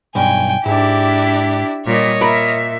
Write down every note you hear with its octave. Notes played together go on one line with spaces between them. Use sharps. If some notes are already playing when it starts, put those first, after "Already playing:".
B1 G2 G5 G#5
G#2 D4 E4 G4
A#2 G3 C#5 D#5
A#2 A#4 E5 A#5 B5